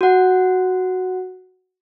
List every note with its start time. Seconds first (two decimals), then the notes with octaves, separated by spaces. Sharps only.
0.01 F#4 F#5